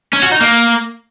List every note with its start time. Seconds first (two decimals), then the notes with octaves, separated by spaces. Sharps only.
0.13 C#4
0.23 F#4
0.32 D#4
0.41 A#3